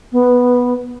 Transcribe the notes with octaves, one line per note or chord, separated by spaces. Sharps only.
B3